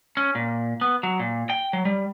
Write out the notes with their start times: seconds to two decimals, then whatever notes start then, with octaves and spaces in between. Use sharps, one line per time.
0.17 C#4
0.35 A#2
0.81 B3
1.03 F#3
1.19 A#2
1.50 G5
1.73 F#3
1.85 G3